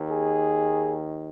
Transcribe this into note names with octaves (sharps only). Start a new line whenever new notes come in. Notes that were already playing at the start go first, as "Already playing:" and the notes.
Already playing: D#2 D#3
G#4